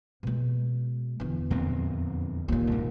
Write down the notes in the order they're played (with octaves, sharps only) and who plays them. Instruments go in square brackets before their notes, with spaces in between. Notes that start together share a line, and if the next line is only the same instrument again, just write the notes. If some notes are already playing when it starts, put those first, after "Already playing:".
[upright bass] B2 G#3
E2 D3
[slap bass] F2 A#2 C4
[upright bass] D#2 A#2
[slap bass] C2 G#2